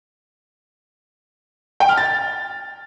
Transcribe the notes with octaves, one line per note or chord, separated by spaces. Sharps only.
G5
F6
A6